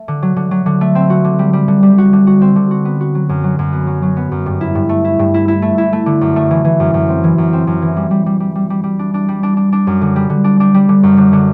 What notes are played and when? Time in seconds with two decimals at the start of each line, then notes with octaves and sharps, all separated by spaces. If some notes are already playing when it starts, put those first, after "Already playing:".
Already playing: A3
0.08 D3
0.22 F#3
0.36 D3
0.51 F#3
0.66 D3
0.81 A3
0.95 C4
1.10 F#4
1.24 D3
1.39 G3
1.53 G3
1.68 D3
1.83 G3
1.98 F#4
2.13 D3
2.27 F#4
2.42 C4
2.56 D3
2.71 F#4
2.85 B3
3.01 F#4
3.15 F#3
3.29 F#2
3.44 F#3
3.59 F#2
3.73 B3
3.87 F#3
4.03 F#3
4.17 B3
4.32 F#2
4.46 G2
4.61 E4
4.75 G2
4.89 A3
5.04 E4
5.19 G2
5.34 E4
5.48 E4
5.62 A3
5.78 E4
5.93 A3
6.06 D3
6.21 F#2
6.36 A3
6.51 E3
6.65 E3
6.80 F#2
6.94 F#2
7.09 C4
7.24 E3
7.38 F#2
7.53 C4
7.67 F#2
7.82 E3
7.97 G3
8.11 G3
8.26 G3
8.40 G3
8.55 G3
8.70 G3
8.84 G3
8.99 D4
9.14 D4
9.28 G3
9.43 D4
9.57 D4
9.72 D4
9.87 F#2
10.01 D3
10.16 G3
10.30 D3
10.44 D4
10.60 D4
10.74 G3
10.89 D3
11.03 F#2
11.17 D3
11.33 D3